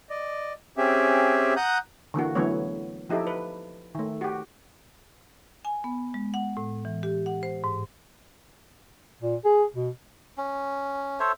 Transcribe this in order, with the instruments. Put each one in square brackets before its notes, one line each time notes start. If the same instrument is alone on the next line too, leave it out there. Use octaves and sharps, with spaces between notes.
[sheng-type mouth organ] D5 D#5
C4 C#4 G4 G#4 E5
F#5 A#5 D#6 F#6 G6
[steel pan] D3 E3 A#3 F#4
D3 E3 F#3 A3 B3 C#5
F3 D#4 E4 G4 A4
B4
D#3 A3
F#4 G4
[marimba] G#5
B3
G#3
F#5
A2
E3
G4
F#5
C5
G#2
[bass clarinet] A#2
G#4
B2
[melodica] C#4
A4 C5 C#5 E5